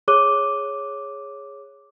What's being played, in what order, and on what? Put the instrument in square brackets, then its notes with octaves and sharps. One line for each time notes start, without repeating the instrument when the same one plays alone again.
[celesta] G#4 C#5 D6 F#6 D#7 G7